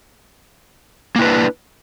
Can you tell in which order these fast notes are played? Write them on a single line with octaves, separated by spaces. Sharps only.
A#3 E4 B4 D4